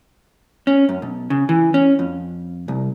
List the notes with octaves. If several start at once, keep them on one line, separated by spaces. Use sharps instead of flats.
C#4
F#2
B1
C#3
E3
C#4
F2
C2